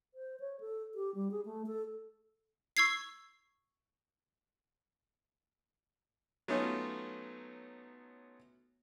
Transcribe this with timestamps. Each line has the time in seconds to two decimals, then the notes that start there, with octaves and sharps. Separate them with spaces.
0.14 C5
0.40 C#5
0.60 A4
0.94 G4
1.15 G3
1.31 G#4
1.45 A3
1.66 A4
2.77 C#6 E6 G#6 C7
6.48 F#3 A3 B3 C#4 D#4 F4